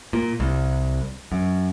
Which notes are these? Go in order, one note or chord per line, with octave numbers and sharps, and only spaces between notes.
A#2
C2
F#2